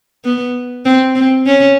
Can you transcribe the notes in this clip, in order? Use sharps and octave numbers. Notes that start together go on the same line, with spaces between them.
B3
C4
C4
C#4